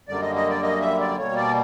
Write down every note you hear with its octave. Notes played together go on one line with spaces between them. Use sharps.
F#2 D3 G3 A#3 D5
D#5
D#5
D5
D#5
E5
D5
B2 G3 A#3 C#5
D5